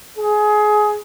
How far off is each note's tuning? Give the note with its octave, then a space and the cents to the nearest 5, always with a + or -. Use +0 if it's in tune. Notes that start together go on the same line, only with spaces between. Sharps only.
G#4 +20